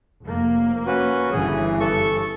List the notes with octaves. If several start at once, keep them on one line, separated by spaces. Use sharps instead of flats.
F1 A#3
C#4 F#4 B4
G1 C#3 E3 G#4
A4 C#6